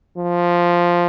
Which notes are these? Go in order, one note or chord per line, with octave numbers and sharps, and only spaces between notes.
F3